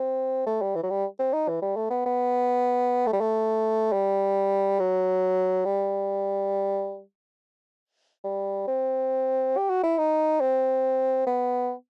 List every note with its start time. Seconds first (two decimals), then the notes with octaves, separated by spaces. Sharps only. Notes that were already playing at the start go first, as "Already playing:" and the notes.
Already playing: C4
0.46 A3
0.62 G3
0.75 E3
0.83 F#3
0.90 G3
1.19 C4
1.33 D#4
1.48 E3
1.62 G3
1.77 A3
1.90 B3
2.06 B3
3.07 A3
3.13 G3
3.21 A3
3.92 G3
4.79 F#3
5.65 G3
8.24 G3
8.67 C4
9.57 G4
9.70 F#4
9.83 E4
9.98 D#4
10.41 C4
11.27 B3